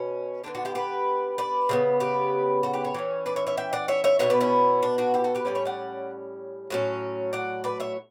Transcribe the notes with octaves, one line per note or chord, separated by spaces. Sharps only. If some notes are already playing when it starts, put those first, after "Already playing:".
Already playing: B2 C#4
D3 G3 B3 D4
D4 F#4
E4 G4
G4 B4
B4 D5
C#3 G3 B3
G4 B4
F#4 A4
G4 B4
A4 C#5
E3 A3 C#4
B4 D5
C#5 E5
C#5 E5
E5 G5
D5 F#5
C#5 E5
C#5 E5
B2 G3 B3 C#5 E5
B4 D5
C#4 E4
D4
D4 F#4
E4 G4
F#4 A4
G4 B4
A2 G3 C#4 B4 D5
C#5 E5
D5 F#5
A2 F#3 C#4
D5 F#5
B4 D5
C#5 E5